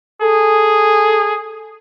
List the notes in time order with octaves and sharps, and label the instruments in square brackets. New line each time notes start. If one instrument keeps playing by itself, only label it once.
[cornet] G#4 [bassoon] A4